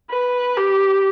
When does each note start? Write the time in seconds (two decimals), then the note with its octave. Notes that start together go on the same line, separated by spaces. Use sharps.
0.10 B4
0.57 G4